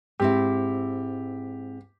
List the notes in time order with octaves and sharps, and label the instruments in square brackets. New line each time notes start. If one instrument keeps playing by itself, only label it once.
[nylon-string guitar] G#2 C4 E4 [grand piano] G4